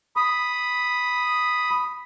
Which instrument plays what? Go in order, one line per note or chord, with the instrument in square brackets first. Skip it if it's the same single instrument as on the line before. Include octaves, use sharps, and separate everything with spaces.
[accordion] B5 D#6